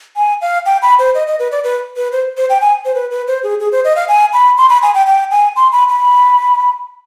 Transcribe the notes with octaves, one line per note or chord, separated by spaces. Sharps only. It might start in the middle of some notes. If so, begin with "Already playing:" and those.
G#5
F5
G5
B5
C5
D#5
D#5
B4
D5
B4
B4
C5
C5
G5
G#5
C5
B4
B4
C5
G#4
G#4
C5
D#5
F5
G#5
B5
C6
B5
G#5
G5
G5
G#5
C6
B5
B5